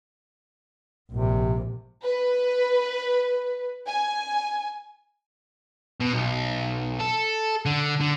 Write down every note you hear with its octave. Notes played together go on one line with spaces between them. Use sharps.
A#1 G#2 C3
B4
G#5
B2
B1
A4
D3
D3